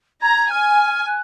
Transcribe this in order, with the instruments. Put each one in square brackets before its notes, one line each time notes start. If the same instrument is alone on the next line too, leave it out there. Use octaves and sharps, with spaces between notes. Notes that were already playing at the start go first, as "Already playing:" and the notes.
[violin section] A#5 [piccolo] G#6
[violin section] G#5 [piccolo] F6
[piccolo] F#6